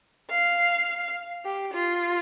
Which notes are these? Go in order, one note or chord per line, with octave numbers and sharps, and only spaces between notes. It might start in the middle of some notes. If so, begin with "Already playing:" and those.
F5
G4
F4